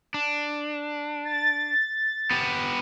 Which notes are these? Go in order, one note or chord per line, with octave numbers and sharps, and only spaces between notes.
D4
A6
B3 G4